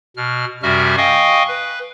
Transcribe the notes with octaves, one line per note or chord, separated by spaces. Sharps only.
B2 F6
F#2 C3 G3 F#4 E5 F6
D#5 F5 G5 G#5 C#6 D#6
B4